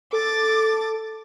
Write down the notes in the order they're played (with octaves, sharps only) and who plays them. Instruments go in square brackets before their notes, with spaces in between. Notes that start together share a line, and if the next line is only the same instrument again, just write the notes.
[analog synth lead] A4 [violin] D6 A6